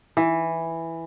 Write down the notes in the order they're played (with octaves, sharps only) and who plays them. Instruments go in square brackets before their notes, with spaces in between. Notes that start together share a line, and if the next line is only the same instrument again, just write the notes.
[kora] E3